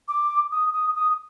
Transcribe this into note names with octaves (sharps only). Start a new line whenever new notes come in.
D6
D#6
D#6
D#6